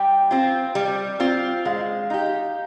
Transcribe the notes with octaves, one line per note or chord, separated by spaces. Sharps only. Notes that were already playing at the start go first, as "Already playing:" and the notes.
Already playing: G3 G5
C4 F4
G3
C4 F4
G#3 F5
D#4 G4